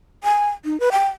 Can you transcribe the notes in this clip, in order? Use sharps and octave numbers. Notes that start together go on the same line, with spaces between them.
G#5
D#4
B4
G5